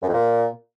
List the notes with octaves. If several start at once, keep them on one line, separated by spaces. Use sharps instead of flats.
F#2
F2
A#2